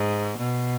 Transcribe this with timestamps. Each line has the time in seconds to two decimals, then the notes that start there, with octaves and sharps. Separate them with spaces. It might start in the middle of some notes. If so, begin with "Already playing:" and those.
Already playing: G#2
0.38 B2